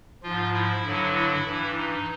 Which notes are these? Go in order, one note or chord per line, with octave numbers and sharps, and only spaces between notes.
G#2 F3 F4
E4
G2 D3 F#3
E4
G2 E3
D#4